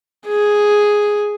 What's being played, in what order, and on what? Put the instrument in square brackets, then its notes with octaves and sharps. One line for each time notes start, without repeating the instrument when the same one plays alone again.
[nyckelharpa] G#4